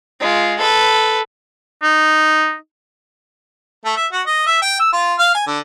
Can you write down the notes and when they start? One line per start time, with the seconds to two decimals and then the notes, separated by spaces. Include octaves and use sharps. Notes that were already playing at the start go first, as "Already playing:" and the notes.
0.20 G#3 F4
0.59 A4 B4
1.83 D#4
3.85 A3
3.96 E5
4.12 F#4
4.27 D#5
4.46 E5
4.62 G5
4.80 E6
4.93 F4
5.19 F5
5.35 G#5
5.47 D3